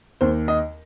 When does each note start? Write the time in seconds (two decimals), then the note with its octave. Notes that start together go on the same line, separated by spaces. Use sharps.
0.21 D#2 C5
0.48 D#5